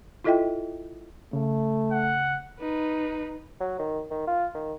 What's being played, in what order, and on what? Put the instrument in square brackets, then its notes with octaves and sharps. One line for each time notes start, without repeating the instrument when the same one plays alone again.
[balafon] E4 F4 A4 D#5 E5 G5
[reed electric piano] C#3 [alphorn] A3
[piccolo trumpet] F#5
[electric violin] D#4 B4
[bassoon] F#3
D#3
D#3
F4
D#3